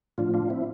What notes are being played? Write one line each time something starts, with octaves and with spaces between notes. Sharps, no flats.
A2 F3 D4 F4
D4 F4
C4 E4